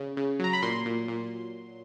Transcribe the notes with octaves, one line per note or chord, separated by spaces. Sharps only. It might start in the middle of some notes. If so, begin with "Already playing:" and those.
Already playing: C#3
C#3
F#3 A#5
B5
A#2 C6
A#2
A#2